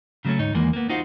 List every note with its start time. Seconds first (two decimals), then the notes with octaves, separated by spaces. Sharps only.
0.25 C#3 F#3 G3 A3 C#4
0.39 D2 G#2 D#4 C#5
0.54 E2 D#3 E3 G#3 A#3
0.73 A#3 B3
0.89 D#4 F4 F#4 C5